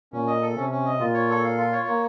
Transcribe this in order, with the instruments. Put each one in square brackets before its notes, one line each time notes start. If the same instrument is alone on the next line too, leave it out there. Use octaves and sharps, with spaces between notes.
[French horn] A#2 [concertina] C#4
[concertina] D#5
A4
[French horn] C3 [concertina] C#4
[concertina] C#4
D#5
[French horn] A#2 [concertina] F4
[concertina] C#5
A4
F5
F4
C#5
A#3